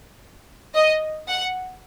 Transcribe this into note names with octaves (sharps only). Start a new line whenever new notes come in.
D#5
F#5